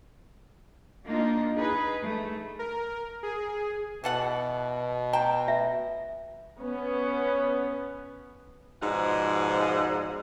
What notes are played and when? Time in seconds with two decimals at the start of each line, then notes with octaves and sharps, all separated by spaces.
1.05 A#3 D4 D#4 F4
1.56 D#4 G#4 B4
2.02 A3
2.59 A#4
3.23 G#4
4.04 B2 E3 A4 F#5
5.13 G5 A#5
5.48 E5
6.61 B3 C#4
8.82 G#2 B2 F3 D#4 D5 F#5